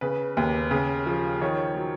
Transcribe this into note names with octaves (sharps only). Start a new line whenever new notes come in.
C#3 B4
D#2
C#3
F3
D#3 C#5
F#3